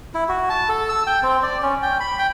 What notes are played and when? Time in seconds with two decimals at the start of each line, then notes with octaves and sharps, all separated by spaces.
0.14 E4
0.29 F#4
0.50 A5
0.69 A4
0.89 E6
1.07 G5
1.23 C4
1.43 D5
1.63 C#4
1.82 G5
2.00 B5
2.19 G5